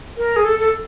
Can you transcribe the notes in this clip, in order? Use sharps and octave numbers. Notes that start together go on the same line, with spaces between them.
A#4
G#4
A4
A4